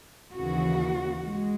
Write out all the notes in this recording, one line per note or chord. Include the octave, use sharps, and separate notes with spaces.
D#2 C#3 E3 F#4
G#3